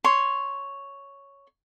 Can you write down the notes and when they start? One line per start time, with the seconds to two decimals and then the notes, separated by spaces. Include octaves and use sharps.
0.04 C#5 C6